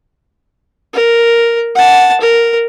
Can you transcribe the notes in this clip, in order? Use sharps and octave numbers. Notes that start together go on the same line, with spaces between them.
A#4
F#5 A5
A#4